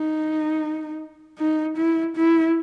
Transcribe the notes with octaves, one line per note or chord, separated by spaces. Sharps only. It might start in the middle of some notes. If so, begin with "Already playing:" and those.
Already playing: D#4
D#4
E4
E4